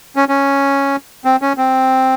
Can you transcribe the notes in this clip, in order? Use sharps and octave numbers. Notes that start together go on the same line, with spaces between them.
C#4
C#4
C4
C#4
C4